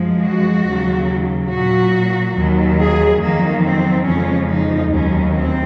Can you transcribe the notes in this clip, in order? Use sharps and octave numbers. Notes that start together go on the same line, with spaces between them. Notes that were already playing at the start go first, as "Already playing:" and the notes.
Already playing: F#2 F3 G#3
F#4
D#2 C#3 F#3
F#3 F#4
A#2
D#2 D#3 F#3
G#4
F2 D#3 F#3 A#3
C4
F2 C#3 F3 G#3 C#4
D#4
D#2 D#3 F#3 C#4
C4